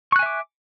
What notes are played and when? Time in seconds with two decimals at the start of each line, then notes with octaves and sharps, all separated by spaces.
0.12 C#6
0.16 F#6
0.19 G#5
0.23 E5
0.26 D6